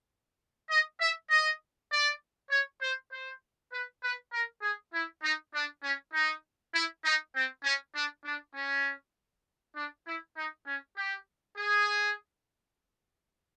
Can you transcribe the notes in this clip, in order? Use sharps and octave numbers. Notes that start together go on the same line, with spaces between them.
D#5
E5
D#5
D5
C#5
C5
C5
B4
B4
A#4
G#4
E4
D#4
D4
C#4
D#4
E4
D#4
C4
C#4
D4
D4
C#4
D4
E4
D#4
C#4
G4
G#4